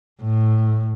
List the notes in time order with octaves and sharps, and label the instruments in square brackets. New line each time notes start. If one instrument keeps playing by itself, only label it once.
[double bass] A2